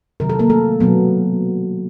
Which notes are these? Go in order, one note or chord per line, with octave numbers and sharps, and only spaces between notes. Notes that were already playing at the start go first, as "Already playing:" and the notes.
C3 D#3 F#3 A#4
A4
A#3 A#4
A3 A4
B2 F#3 B3